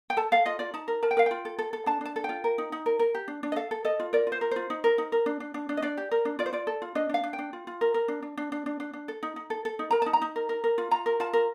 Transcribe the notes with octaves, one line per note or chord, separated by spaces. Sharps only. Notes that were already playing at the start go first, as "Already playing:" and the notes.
G5
A4 A5
A4 F5
F4 D#5
F4 D5
D#4 A5
A#4
A#4 A5
G5
A#4 F5
F4 G5
A4
A4
A4
D4 A5
D4 A5
A4
G5
F4
A#4
D#4
D#4
A#4
A#4
G4
D4
D4
D#5
A4 F5
A4
A4 D#5
F4
A#4 D5
F4
C5
A#4
F4 C5
D#4
A#4
D#4
A#4
D4
D4
D4
D4
D#5
D4 D5
G4
A#4
D4
F4 D5
C5
F4 D5
A4
F4
D4 D#5
D4 F5
D4
G5
D4
F4
F4
A#4
A#4
D4
D4
D4
D4
D4
D4
D4
A4
D#4
D#4
A4
A4
D#4
A#4 A#5
D#4 A5
A#5
D#4
A#4
A#4
A#4
F4
F4 A#5
A#4
F4 A5
A#4